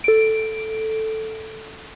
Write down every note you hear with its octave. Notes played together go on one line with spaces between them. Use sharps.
A4 D7